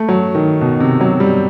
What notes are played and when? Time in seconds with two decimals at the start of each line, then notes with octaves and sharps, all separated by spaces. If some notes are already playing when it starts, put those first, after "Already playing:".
Already playing: A3
0.09 F#3
0.35 D#3
0.61 B2
0.80 C3
1.01 F#3
1.20 G3